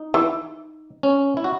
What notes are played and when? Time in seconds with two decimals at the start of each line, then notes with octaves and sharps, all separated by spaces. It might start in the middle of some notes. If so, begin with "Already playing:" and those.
Already playing: D#4
0.14 E3
1.03 C#4
1.37 E4
1.44 F#4